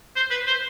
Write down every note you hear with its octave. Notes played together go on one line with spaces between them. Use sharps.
C5
B4
C5